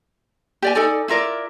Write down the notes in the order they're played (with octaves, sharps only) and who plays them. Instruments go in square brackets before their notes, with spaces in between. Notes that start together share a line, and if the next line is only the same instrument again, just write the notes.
[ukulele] G4 D5 G#5
D#4 A4 D5 G#5
E4 F4 A#4 D5